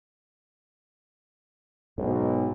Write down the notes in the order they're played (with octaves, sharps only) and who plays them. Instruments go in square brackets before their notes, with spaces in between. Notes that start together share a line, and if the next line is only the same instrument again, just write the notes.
[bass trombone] B1 [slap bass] G#2